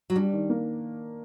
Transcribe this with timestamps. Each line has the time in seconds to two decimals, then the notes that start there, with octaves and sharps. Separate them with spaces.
0.10 F#3
0.16 G3 D4
0.33 D#3
0.50 A#3